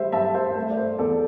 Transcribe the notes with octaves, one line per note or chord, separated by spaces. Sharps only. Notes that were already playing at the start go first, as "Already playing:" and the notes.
Already playing: G3 C5 E5
G2 E5 A5
C5 E5
A3 C5
D5
C5
E2 A4 D5